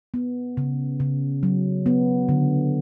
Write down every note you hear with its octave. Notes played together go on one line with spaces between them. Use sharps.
B3
C#3
C#3
F#3
B3
D3